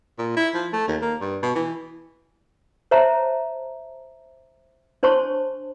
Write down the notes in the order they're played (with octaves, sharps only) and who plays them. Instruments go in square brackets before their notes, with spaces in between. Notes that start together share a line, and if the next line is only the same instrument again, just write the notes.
[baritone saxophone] A#2
E4
F3
A3
D#2
A#3
G2
B2
E3
[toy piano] C5 C#5 E5 A5 A#5
D4 C5 C#5 A5 C6 C#6